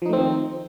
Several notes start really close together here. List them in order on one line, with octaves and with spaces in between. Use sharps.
F3 D#4 A3 C4 D#3